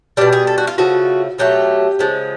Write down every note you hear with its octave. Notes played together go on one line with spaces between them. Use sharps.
B2 G3 D4
G#4
A4
F#4
F4
C#3 F3 A3 F#4
B2 F#3 A3 G4
C#3 F3 G#3